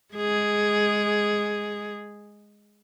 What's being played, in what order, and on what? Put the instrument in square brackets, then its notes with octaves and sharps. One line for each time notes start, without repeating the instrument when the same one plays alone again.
[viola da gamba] G#3 G#4